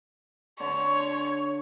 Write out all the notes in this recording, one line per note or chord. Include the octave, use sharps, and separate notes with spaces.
D3 C#5 A5 C6